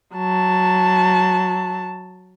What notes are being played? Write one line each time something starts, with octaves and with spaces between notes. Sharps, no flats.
F#3 A5